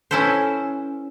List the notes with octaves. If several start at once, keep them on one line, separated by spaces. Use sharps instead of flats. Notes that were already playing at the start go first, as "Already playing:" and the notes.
C#4 E4 A4 B4 C5